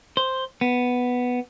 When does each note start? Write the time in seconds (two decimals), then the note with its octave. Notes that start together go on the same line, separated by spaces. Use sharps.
0.17 C5
0.61 B3